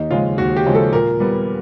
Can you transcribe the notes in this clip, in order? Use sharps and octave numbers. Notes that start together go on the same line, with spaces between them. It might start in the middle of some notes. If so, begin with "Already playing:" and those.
Already playing: D#2 D#4
C#3 F3 G#3 F4
D#2 F#4
G4
C#3 F3 G#3
A4
A#2 A#4
G3 B3